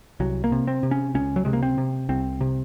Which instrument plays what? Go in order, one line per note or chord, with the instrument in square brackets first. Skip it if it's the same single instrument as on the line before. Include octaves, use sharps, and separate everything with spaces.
[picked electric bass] C2 F#3
A#3
C3
C4
C3
C#4
C#2 C#4
F#3
C3 G#3
A#3
C4
C3
C2 C4
C3